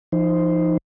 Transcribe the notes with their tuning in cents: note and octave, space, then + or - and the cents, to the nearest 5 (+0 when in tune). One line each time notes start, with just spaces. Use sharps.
F3 -35 D#4 +0 C5 +0